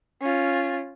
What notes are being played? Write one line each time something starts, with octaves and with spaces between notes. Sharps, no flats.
C#4 F4